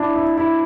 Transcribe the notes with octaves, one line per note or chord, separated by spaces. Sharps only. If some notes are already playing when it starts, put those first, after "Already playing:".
Already playing: D4 E4
E4
E4